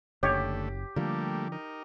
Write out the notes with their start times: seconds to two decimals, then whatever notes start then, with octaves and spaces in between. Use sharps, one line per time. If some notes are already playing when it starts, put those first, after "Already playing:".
0.23 F#1 D3 A3 G4 C#5 D#5
0.96 D3 F3 G3 A3 A#3
1.52 D#4 A#4